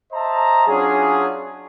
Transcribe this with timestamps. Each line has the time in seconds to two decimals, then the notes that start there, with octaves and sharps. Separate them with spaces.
0.13 C5 D#5 E5 A5 A#5
0.67 F#3 C#4 D4 F4 G#4